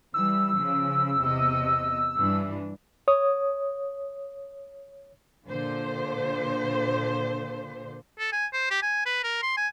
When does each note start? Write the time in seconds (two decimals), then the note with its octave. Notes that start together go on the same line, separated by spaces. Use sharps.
0.14 E3 G3 E6
0.57 C#3 F3
1.19 E2 C3 D#5
2.17 G2 E3 D4
3.08 C#5 D#6
5.46 A#2 D3 C5
8.19 A4
8.33 G#5
8.53 C5
8.71 G4
8.83 G#5
9.06 B4
9.24 A#4
9.43 C6
9.57 G#5